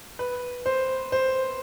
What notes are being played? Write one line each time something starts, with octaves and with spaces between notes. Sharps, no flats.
B4
C5
C5